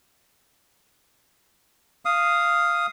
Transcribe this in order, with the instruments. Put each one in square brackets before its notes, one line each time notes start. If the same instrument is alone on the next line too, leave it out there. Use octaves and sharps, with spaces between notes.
[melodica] F5 D#6